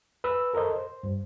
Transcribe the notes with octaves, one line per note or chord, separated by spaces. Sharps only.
B4 E6
A4 A#4 C5 D#5
C5
G2